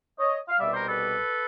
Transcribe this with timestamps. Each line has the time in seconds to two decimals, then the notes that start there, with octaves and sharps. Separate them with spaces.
0.19 C#5 D#5
0.49 F5
0.60 C2 B2 G3 D5 E5
0.73 A#4 C5
0.87 A4 B4